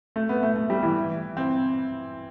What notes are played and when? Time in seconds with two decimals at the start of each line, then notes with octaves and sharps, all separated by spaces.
0.16 A3
0.29 B3
0.43 A3
0.56 A3
0.70 G3
0.82 E3
1.37 C4